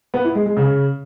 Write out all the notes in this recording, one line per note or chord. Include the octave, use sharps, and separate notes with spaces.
B3
E4
G#3
G#3
C#3